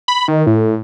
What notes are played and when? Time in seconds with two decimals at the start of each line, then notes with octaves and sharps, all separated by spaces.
0.08 B5
0.28 D#3
0.47 A2